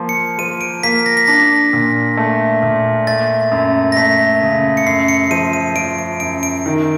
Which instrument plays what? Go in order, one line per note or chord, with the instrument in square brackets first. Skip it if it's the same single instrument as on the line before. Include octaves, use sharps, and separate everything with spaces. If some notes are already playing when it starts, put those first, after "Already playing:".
Already playing: [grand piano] F3 A#3
[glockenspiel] C#7
[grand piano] F3 [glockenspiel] D#7
[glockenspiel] D7
[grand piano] A#3 [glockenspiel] B6
[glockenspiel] A#6
B6
[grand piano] D4 [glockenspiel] A#6
[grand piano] A#2
A3
A#2
[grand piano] A3 [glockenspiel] A6
[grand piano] F#2
[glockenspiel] A#6
[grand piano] A3 [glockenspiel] B6
[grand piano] C#3
[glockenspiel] C#7
[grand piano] F#2 [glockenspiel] C7
[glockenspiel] C#7
[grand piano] F3 [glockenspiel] D#7
[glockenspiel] D#7
[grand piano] F3 [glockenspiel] D7
[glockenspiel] D7
[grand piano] F#2 [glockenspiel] D7
[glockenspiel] D7
[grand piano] D#3